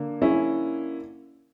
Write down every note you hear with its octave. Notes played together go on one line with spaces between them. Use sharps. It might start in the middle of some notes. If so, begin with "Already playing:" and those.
Already playing: D3 A#3
C#4 E4